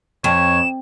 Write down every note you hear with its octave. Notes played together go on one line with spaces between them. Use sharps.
F2 C#5 E7